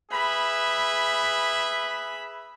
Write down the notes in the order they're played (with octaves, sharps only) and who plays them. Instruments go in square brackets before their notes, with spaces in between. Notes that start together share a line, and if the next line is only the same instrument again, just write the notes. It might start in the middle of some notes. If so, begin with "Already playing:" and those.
[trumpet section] G#4 B4 E5 [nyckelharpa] B5